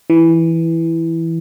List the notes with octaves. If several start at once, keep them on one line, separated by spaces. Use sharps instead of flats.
E3